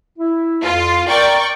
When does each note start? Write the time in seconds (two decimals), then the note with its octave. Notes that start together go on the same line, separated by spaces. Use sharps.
0.19 E4
0.64 F2 F4
1.09 A#4 D5 G5 C#6